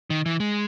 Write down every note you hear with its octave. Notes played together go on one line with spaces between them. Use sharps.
D#3
E3
G#3